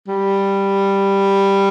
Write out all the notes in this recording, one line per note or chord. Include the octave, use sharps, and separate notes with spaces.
G3